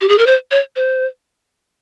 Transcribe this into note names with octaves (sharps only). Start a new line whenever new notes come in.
G4
G#4
A#4
C5
C#5
C5